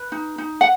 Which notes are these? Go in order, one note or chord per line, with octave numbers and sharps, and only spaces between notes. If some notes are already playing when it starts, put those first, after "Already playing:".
Already playing: B4
D#4
D#4
F#5